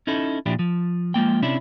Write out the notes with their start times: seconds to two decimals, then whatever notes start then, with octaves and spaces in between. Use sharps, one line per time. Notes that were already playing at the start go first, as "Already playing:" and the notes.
0.07 C#4 D#4 E4 A4
0.46 A#2 F3 D4 E4 G4
0.59 F3
1.14 F3 G#3 A#3 G5
1.43 C3 C#4 D4 E4